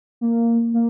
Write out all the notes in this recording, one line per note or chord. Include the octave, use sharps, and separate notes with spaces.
A#3
A#3